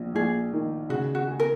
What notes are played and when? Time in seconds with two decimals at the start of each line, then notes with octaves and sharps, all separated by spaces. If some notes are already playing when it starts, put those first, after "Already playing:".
Already playing: A#1
0.15 A#1 G#4
0.53 D#3
0.89 C#3 F#4
1.15 F#4
1.27 G#4
1.40 A#4